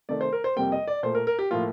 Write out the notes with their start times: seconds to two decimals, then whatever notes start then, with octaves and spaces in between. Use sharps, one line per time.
0.09 C3 D#3 A3 D5
0.21 C5
0.33 A#4
0.44 C5
0.56 F2 C3 G3 A#3 G5
0.72 D#5
0.87 D5
1.03 A#2 A3 C5
1.15 A#4
1.27 A#4
1.39 G4
1.51 A2 F3 A#3 F4